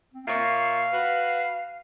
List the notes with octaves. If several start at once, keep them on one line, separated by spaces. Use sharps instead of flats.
C4
A#2 C#5 E5 F5
F#4 B4